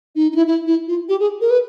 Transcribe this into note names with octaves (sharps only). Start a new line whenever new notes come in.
D#4
D#4
E4
E4
E4
F4
G4
G#4
A#4
B4